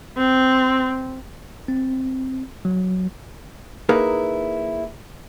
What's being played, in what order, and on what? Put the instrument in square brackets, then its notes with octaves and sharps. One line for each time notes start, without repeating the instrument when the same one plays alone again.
[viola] C4
[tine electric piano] C4
F#3
[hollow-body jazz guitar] A#3 D#4 E4 G#4 A#4 B4